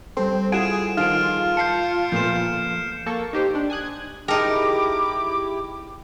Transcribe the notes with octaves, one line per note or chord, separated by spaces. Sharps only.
G3 C4 A4
E4 F4 G#4 F#5 D7 E7
D#3 F3 F4 G#4 F6 D7
F5 A5 G6 C7 C#7
A#2 F3 A3 B3 G6 E7
A#3 A4 C#6
D#4 G4 C5
D4
G#5 D#6 F#6 G#6
G#6
D#4 E4 G4 G#4 A#4 G5 A5 D6